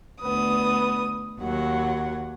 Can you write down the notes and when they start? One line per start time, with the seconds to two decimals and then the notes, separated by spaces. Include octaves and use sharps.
0.21 D2 B3 D#6
1.40 D#2 F#3 F#5